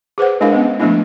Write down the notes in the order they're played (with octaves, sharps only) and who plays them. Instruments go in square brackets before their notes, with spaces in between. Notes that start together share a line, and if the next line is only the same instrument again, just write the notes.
[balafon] G#4 B4 C5 F#5
G#3 D4 E4 A#4 F5
G#3 B3 C#4
F3 G#3 A3 B3 D4 E4